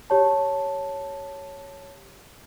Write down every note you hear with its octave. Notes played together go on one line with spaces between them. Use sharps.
G4 C#5 A5